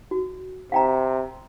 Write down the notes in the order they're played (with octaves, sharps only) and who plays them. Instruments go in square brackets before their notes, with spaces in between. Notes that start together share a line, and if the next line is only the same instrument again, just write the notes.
[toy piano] F#4
[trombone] C3 [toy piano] F5 G5 A#5